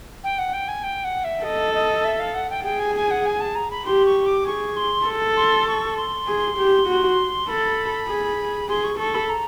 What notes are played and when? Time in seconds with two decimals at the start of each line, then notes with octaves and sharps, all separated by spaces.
0.23 G5
0.38 F#5
0.53 G5
0.68 G#5
0.83 G5
1.04 F#5
1.24 E5
1.43 A4 D#5
1.74 D#5
2.04 E5
2.19 F5
2.34 F#5
2.49 G5
2.64 G#4 G5
2.79 G#5
2.95 G#5
3.10 F#5
3.25 G#5
3.40 A5
3.55 A#5
3.70 B5
3.85 G4 C6
4.05 C#6
4.25 D6
4.45 G#4 C#6
4.76 C6
5.05 A4
5.36 C6
5.67 C#6
5.96 C6
6.27 G#4
6.58 G4
6.87 F#4
7.48 A4 B5
8.08 G#4
8.68 G#4 C6
8.83 C#6
8.99 A4 C#6
9.14 B5
9.29 A#5